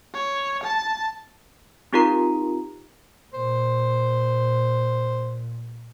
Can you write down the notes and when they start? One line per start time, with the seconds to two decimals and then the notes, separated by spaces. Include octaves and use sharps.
0.14 C#5
0.63 A5
1.93 C4 D#4 F4 G4 A#4 A#5
3.34 A#2 C5